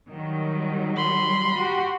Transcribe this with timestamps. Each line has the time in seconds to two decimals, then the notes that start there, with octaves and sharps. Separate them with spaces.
0.11 D#3 F#3 G3
0.96 B5 C6
1.56 F#4 G4